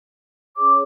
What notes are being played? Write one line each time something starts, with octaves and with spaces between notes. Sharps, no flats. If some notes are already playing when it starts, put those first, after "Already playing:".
C#4 G#4 C#5 D6